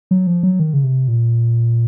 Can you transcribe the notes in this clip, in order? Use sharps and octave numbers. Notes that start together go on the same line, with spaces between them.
F#3
F3
F#3
D#3
C#3
C3
A#2